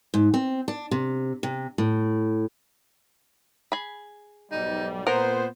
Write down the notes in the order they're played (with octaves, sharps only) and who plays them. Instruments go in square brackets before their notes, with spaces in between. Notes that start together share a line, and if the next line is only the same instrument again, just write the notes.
[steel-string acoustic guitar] G#2
C4
D4
C3
C3
A2
[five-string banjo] G#4 B5
[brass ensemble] B1 G#2 G3 [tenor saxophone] D#4
[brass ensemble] A#2 C5 [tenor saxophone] B3 [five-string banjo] A#4